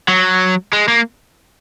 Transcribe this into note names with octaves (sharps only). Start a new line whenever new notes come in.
F#3
G#3
A#3